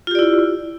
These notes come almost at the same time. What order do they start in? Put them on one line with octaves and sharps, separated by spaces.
F4 G4 D5 E4